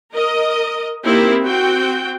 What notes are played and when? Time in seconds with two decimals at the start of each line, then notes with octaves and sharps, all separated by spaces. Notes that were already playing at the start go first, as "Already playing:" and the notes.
0.13 A#4 D#5
1.04 A#3 C4 D#4 E4 G4 A#4
1.45 C4 F#4 G5